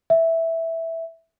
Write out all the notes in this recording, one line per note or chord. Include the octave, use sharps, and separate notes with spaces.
E5